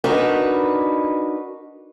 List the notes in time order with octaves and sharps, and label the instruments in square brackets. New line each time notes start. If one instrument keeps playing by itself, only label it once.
[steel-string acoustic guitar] D4 D#4 F#4 A#4 B4